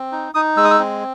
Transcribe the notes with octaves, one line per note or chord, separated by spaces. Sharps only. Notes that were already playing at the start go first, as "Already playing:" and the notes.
Already playing: C4
D#4
D#4 D#6
G#3 E6
D#6
E6
C4